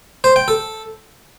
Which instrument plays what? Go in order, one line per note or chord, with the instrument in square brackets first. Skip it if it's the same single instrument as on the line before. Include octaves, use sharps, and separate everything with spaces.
[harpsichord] C5
G5
A4